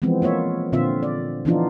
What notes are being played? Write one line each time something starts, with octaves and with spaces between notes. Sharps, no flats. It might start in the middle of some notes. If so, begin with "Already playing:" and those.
E3 F3 G#3 B3 C4
A#3 F4 C#5 E5
A#2 D3 C4 F4 E5
D5
E3 F3 B3 D4 D#4 F4